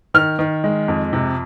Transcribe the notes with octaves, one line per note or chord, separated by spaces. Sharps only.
D#3 F6
D#3
G#3
F2
C3